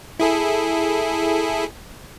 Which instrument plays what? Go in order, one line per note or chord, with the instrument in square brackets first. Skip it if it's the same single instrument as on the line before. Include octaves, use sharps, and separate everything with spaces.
[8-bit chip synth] E4 G#4 A4